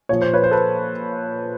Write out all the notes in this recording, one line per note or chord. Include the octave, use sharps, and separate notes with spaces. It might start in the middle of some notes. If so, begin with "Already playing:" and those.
A#2 F3 C#5
C5
B4 C#5
C5
A4 B4